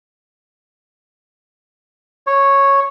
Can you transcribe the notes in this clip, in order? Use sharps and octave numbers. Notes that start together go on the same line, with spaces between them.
C#5